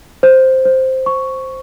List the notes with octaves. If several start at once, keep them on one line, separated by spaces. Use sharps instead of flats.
C5
C5
C#6